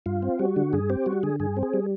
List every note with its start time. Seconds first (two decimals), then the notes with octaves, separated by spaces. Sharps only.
0.06 G2 F4
0.22 C4
0.39 G3 F#4
0.56 D3
0.73 G2 G#4
0.90 C4 G4
1.06 G3 F#4
1.23 D3 G#4
1.40 G2 G#4
1.57 C4
1.63 G#4
1.74 G3